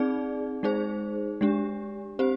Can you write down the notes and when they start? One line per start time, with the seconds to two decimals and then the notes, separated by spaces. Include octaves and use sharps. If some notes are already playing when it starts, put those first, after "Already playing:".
Already playing: C4 D#4 G#4 D5
0.63 G#3 D#4 G#4 C5
1.41 G#3 D4 G4
2.19 C4 G4 C5